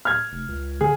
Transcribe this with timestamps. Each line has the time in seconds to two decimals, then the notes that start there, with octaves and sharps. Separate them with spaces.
0.05 F6 G#6
0.32 F1
0.48 C#2
0.81 D3 G#4